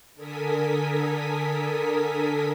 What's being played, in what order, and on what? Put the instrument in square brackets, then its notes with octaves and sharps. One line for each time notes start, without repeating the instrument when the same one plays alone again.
[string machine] D3 A4 A#4 G#5 D#6 B6